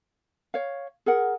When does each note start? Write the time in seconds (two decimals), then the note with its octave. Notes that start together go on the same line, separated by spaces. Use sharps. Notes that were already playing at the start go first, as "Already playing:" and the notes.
0.54 C#5 F5
1.06 G#4 A#4 F#5